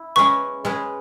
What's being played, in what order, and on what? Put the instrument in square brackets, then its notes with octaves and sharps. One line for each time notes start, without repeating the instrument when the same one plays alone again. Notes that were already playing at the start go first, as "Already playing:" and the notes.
Already playing: [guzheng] E4
[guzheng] G#3 C#4 G#4 B4 [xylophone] C#6
[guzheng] G#3 C#4 G#4 B4